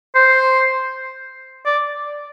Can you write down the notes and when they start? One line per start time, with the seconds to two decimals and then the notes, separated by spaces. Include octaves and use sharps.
0.15 C5
1.66 D5